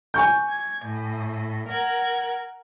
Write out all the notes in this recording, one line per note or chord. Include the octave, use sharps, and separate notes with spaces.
G#5 C#6 G6
G#6
A2
A#4 F#5 G#6